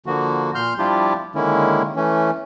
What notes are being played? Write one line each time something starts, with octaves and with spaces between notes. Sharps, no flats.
D3 F3 A#3 F#4
A#2 C6 F6 G6
F3 G3 D4 E4 F4 G4
D3 D#3 G#3 A#3 C#4 E4
E3 A3 C#4